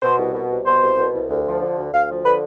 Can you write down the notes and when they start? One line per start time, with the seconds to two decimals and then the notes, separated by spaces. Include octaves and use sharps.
0.02 B2 C5
0.18 C2
0.34 B2
0.50 C2
0.66 B2 C5
0.82 C2
0.97 B2
1.13 C2
1.29 D2
1.46 F3
1.62 D3
1.77 D2
1.92 D2 F5
2.09 F3
2.24 D3 B4